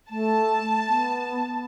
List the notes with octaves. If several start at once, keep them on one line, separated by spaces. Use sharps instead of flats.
A3 A5
B3